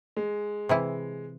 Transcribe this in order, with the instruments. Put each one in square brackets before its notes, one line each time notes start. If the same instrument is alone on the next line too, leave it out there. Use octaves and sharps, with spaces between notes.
[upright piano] G#3
[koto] C3 E3 E4